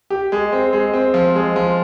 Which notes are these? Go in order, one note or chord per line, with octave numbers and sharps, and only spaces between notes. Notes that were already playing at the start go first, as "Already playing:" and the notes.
G4
G#3
C4
G#3
C4
F3
G#3
F3